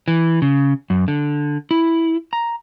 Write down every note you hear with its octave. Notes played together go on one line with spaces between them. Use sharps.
E3
C#3
F#2
D3
E4
A#5